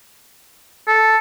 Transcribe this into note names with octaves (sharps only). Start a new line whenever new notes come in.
A4